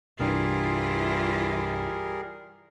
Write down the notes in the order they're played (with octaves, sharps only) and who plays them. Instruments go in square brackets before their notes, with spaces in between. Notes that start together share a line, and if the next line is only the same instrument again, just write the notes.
[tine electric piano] C2 G2 [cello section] E3 E4 F4 [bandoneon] G3 G#4 A#4